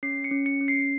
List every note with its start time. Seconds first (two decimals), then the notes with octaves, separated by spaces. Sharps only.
0.03 C#4 C7
0.24 C#7
0.31 C#4
0.46 C#7
0.61 C#4
0.68 C7